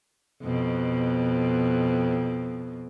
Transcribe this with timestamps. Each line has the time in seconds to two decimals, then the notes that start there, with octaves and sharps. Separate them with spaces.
0.43 F2 B2